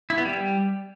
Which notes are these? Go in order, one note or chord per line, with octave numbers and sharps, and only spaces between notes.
E4
B3
G3